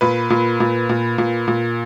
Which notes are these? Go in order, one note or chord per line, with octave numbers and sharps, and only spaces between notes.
A#2 B4
A#2
A#2
A#2
A#2
A#2